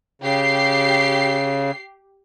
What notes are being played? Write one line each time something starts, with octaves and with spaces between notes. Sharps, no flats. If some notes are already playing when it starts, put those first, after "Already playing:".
C#3 G4 C7